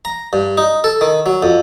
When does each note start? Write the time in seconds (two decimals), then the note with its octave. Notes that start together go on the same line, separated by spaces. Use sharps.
0.05 A#5
0.33 G2
0.57 D#4
0.84 A4
1.01 D#3
1.26 F#3
1.43 F2